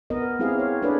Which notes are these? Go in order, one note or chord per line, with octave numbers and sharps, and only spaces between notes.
B3 A#4 D#5
C4 E4 G4 G#4 F5
C#5
D4 G#4 A4 B4 C#5 D5